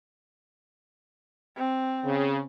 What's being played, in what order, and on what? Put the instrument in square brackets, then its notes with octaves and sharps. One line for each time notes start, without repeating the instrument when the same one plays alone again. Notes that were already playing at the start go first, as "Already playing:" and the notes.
[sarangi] C4
[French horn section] C#3